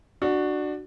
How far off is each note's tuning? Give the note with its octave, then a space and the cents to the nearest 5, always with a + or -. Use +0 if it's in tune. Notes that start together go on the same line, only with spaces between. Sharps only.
D4 +20 F#4 +0